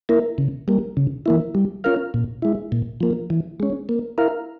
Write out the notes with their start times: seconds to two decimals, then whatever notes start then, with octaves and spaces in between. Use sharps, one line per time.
0.09 A#3 E4 A#4
0.38 C#3
0.68 G3 A#3
0.97 C#3
1.26 E3 A#3 E4
1.55 G3
1.84 C#4 F4 A#4 F5
2.14 A#2
2.42 G#3 E4
2.72 A#2
3.00 F3 A#3
3.30 E3
3.60 G#3 C#4
3.89 A#3
4.18 E4 A#4 F5